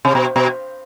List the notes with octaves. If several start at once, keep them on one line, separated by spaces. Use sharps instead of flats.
C3
B2
B2